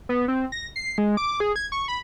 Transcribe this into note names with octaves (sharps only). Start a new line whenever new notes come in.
B3
C4
A#6
C7
G#3
D6
G#4
G#6
C#6
B5